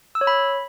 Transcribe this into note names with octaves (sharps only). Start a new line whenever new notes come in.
E6
C#5
B5